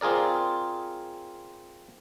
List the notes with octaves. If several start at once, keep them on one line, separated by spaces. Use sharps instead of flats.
C4 F4 G#4 A#4 D5